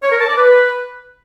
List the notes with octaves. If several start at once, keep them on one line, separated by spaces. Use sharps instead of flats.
C#5
A#4
A5
D5
B4